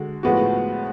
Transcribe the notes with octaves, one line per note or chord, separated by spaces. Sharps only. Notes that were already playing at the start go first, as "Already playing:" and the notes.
Already playing: D3 G#3 F#4
A2 F3 G#3 B3 F#4